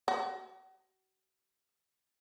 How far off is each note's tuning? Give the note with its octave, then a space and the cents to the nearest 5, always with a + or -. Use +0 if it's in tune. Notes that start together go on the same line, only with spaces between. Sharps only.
F#4 +40